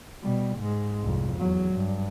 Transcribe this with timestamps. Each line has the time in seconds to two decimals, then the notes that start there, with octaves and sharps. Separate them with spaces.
0.24 B2 G3
0.57 G#2 G#3
1.03 C2 F2
1.38 E2 F#3
1.74 G2